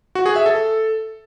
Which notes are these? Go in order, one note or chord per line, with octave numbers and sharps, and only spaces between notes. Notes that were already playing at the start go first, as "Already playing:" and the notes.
F#4
G#4
E5
A4